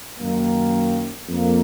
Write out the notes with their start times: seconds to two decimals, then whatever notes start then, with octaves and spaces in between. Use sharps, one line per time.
0.18 F#2 D#3 A#3
1.29 F2 F3 A#3